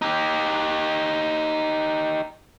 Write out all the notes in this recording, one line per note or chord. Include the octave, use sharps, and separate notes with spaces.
D#4 G4